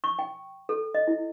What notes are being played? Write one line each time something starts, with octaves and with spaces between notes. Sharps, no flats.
C#6
G5
A4
D#5
E4